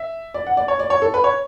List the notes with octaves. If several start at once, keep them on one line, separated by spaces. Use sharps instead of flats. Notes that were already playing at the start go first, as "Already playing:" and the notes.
Already playing: E5
D5
F#5
D5
C#5
D5
C#5
A4
B4
C#5